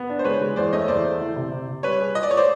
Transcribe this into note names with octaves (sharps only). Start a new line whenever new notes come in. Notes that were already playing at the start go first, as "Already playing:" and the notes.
Already playing: B3
D4
C5
G#3 B4 C#5
G#3
E2 C5 D5
A3 C#5 D#5
E2 C5 D5
A3
E3
C3
C3
C3
G3 B4 C#5
G#4
F4 D#5
D5
F4 C#5
C5 D5